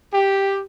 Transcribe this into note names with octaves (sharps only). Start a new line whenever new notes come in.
G4